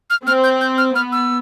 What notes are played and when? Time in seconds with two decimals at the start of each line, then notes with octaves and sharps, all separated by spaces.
0.10 F6
0.26 C4 F6
0.44 G6
0.61 G6
0.78 F6
0.95 B3 F6
1.12 E6